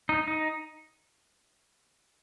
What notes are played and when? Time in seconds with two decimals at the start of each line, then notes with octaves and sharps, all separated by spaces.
0.09 D#4
0.28 D#4